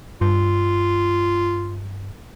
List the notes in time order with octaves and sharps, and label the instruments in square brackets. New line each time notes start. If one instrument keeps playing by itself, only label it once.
[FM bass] G2 [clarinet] F4